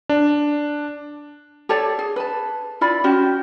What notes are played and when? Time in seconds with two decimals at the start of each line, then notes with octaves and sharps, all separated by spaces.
0.09 D4
1.69 G4 A4 C#5 D5
1.99 G#4
2.16 B4 A5
2.81 E4 F4 D5 B5
3.04 C#4 F#4 G4